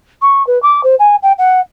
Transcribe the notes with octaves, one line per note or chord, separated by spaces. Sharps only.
C#6
B4
D6
C5
G#5
G5
F#5